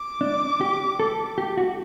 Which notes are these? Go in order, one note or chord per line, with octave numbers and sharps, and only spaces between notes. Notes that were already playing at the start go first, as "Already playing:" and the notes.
Already playing: D6
D4
G4
A4
G4
F#4